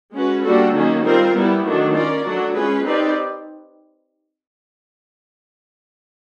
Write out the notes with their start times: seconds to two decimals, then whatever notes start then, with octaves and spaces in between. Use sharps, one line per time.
0.13 G#3 C#4 F#4 B4
0.43 G3 A#3 D4 F#4 A4
0.74 D#3 F#3 A#3 C#4
1.04 G3 C4 F4 A#4
1.34 G3 B3 E4
1.64 D#3 F#3 A3 D4
1.94 C#4 F4 A#4 D5
2.24 F#3 A3 D4 F#4
2.55 G#3 C#4 F4 G#4 B4
2.85 C4 D#4 G4 B4 D5